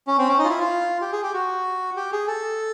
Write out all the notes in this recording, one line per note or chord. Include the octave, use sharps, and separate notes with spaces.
C#4
C4
C#4
D#4
F4
E4
F4
G4
G#4
G4
F#4
G4
G#4
A4